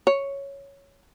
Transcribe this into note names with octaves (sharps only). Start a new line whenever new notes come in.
C#5